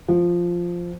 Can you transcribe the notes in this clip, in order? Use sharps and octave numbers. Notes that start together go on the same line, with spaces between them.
F3